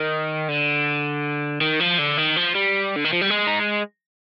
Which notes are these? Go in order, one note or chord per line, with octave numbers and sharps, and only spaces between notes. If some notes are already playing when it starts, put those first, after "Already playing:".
Already playing: D#3
D3
D#3
F3
D3
D#3
F3
G3
D3
D#3
F3
G3
G#3
D#4